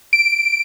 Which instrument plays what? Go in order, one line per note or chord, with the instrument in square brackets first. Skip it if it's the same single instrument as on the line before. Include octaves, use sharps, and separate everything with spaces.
[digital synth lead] D7